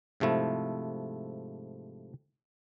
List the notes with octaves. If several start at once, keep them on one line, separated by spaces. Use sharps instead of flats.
G#2 C3 F3 A3 E4